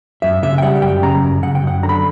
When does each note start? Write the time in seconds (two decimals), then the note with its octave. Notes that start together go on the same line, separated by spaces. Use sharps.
0.22 F#2 E5
0.42 C#3 E5
0.58 G5
0.62 G3 F#5
0.82 F#2 G5
1.03 C#3 A#5
1.23 F#2
1.43 C#3 F#5
1.55 G5
1.63 F#2 F#5
1.83 D3 A#5
1.89 B5